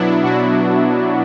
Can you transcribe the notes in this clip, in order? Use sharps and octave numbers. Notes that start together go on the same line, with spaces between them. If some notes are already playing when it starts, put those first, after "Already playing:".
Already playing: B2 F#3 B3 D4 E4
B2 F#4